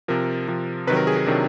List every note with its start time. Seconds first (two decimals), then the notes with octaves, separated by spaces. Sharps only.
0.08 C3 F3 A#4
0.48 C3 F3
0.87 C3 D#3 F#3 B4
0.97 A#4
1.07 G#4
1.17 G#4
1.26 C3 D#3 F#3 D4